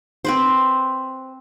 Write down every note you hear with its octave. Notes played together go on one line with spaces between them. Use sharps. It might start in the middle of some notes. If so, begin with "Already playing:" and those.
C4 B4 C5